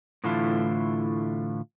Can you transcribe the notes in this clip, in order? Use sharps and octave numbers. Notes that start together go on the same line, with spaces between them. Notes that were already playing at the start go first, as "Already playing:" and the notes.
A2 D3 E3 A3 E4 F4